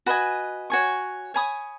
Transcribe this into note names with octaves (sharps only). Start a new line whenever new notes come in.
F#4 B4 D#5 G#5
F#4 C#5 G#5 C#6
C#5 G#5 B5 D#6